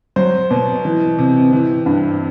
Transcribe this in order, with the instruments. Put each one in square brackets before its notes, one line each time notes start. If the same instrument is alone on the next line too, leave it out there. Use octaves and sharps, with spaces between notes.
[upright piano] F#3 C5
B2
E3
C3
E3
G2